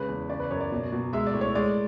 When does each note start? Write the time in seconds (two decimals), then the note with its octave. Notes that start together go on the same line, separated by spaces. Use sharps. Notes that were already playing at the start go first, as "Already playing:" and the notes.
Already playing: C#3 G#3 B4
0.09 E2
0.29 C#3 D5
0.40 B4
0.50 F#2 C#5
0.61 D5
0.72 B2
0.92 B2
1.13 G#3 E5
1.27 D5
1.33 A2
1.41 C#5
1.55 G#3 D5